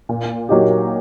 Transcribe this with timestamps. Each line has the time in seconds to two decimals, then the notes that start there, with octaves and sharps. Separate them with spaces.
0.09 A#2
0.49 F#3 A#3 D#4 G4